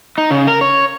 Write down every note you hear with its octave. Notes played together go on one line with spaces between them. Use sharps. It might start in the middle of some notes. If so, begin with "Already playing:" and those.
D#4
C#3
A#4
C#5